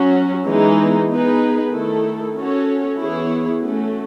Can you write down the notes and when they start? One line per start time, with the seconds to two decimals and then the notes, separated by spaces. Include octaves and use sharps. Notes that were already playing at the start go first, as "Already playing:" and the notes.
Already playing: F#3 C#4 F#4
0.47 E3 G#3 B3 D#4
1.11 B3 D#4 G#4 B4
1.73 D#3 A3 E4 A4
2.37 C#4 F#4 A4 C#5
2.99 E3 B3 E4 G#4 C#5
3.62 A3 C#4 F#4